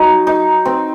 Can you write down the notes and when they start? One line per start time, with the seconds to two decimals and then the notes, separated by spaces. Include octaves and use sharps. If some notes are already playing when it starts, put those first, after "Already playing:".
Already playing: F#3 D#4
0.27 D#4
0.65 C4